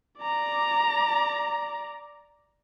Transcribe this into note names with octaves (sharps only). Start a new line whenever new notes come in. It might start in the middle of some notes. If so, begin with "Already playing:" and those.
D5 A#5